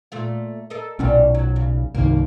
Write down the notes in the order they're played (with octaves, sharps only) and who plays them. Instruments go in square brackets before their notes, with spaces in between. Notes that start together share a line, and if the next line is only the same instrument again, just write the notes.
[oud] A#2 A3 F4
A4 A#4 D#5
[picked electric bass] B1 C#4 [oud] A#2 F#3 G3
[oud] F#3
C#3
[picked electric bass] C2 G2 D#3 [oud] A#3